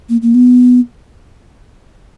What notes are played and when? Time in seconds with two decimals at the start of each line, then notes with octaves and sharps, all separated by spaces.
0.09 A#3
0.22 A#3
0.35 B3